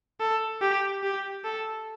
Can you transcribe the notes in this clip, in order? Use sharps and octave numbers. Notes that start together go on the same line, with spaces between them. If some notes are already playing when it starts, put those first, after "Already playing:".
A4
G4
G4
A4